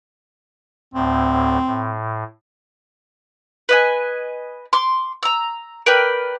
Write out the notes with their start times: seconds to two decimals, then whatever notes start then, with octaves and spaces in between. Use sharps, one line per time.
0.94 D2 A2 C4
1.66 A2
3.69 B4 D#5 G#5
4.73 C6 D6
5.23 A#5 E6
5.86 A#4 B4 D5 G5